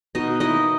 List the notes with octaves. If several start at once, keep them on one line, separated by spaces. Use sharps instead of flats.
B2 D#4 D#5
A#3 D#4 E4 D#5